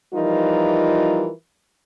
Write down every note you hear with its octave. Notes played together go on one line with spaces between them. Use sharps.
E3 F3 G3 D#4 F4 A#4